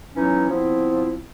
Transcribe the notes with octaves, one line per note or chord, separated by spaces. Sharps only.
E3 F#3 B3 C#4 D#4
F3 B3 C4 E4